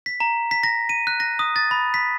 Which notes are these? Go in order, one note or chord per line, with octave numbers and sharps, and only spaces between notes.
B6
A#5
B6
A#6
D#7
F#6
A#6
D#6
A6
B5
B6